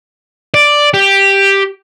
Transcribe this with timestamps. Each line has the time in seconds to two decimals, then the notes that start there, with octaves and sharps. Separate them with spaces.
0.54 D5
0.94 G4